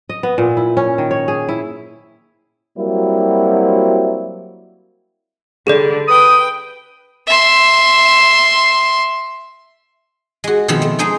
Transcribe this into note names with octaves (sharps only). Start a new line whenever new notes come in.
D#5
B3
A#2
E4
C#4
D#3
C#5
G#4
E4
F#3 G3 A#3 C4 E4 F#4
D3 G3 G#4 A4 D5
B4 G5 D#6
E5 C6
G#3 F#4
B2 D#3 F3 C4 C#5 B5
A3
G#3 D#4 G#4 C5 G5 G#5